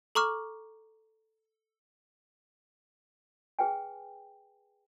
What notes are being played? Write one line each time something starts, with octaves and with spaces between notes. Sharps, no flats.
A4 A#5 C#6 D6 F6
G#4 B4 G5 G#5